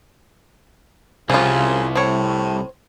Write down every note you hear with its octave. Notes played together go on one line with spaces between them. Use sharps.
C2 C#3 F3 F4
A2 C4 C#5